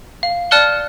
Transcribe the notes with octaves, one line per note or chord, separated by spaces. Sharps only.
F5
D5 A5 F6 F#6 C#7 G7